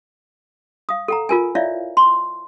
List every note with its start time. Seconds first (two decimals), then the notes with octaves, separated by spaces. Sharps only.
0.89 F5 D#6
1.08 A4 F#5 A#5
1.29 F4 A#4 G#5
1.55 E4 C#5 D5 E5 F5
1.97 C6